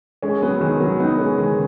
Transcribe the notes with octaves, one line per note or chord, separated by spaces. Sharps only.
G#3 C#4
F#3 B3
D#3 G#3
F#3 B3
B3 D#4
G#3 C#4
D#3 G#3
C#3